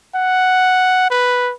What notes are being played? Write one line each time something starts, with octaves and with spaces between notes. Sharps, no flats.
F#5
B4